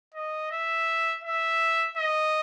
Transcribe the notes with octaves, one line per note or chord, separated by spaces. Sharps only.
D#5
E5
E5
D#5